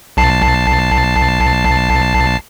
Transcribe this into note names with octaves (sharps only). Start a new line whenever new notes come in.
B1 A5 C7